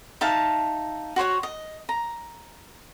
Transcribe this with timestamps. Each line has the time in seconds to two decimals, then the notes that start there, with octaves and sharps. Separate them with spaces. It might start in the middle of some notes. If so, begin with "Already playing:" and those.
0.21 D#4 E5 F5 A5
1.16 F#4 C5 C#5 F#5
1.43 D#5
1.89 A#5